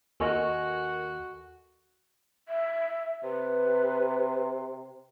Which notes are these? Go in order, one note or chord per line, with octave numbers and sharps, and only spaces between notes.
D#2 F#4 A4 A#4 D#5 G#5 C#6
E5
C3 B4